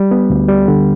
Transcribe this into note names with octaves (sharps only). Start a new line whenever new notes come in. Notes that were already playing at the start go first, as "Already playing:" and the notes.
Already playing: G3
B3
D2
G3
D3